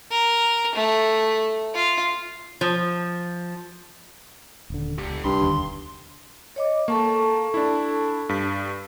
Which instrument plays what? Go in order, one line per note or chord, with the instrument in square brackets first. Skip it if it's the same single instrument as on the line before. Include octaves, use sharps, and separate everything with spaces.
[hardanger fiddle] A#4
A3
F4
[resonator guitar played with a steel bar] F3
[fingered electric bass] D#1 D3
[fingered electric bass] C#2 [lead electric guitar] D3 G4
[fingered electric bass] C2 [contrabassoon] G2 [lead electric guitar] C6
[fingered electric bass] E1 D#2 D3
[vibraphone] C#5 D#5 D6
[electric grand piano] A#3 [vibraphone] A4 A5 C#6
[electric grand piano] D4 E4
G2 B6